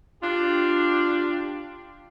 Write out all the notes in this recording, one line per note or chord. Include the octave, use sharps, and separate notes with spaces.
D4 F4 G4